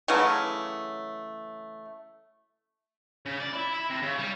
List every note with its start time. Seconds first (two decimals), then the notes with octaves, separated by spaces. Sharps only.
0.08 C#3 E3 F#3 A3
3.26 C#3
3.40 D5
3.53 E4
3.74 E4
3.90 C3
4.03 C#3
4.18 G3